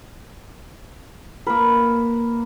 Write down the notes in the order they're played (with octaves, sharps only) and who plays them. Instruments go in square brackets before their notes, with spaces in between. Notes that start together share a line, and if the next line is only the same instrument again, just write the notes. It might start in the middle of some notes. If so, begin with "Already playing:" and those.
[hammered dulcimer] A#3 A#4 [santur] B4